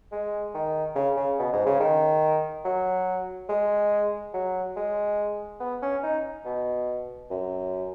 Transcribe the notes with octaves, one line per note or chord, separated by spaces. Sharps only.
G#3
D#3
C#3
C#3
B2
G#2
C#3
D#3
F#3
G#3
F#3
G#3
B3
C#4
D#4
B2
F#2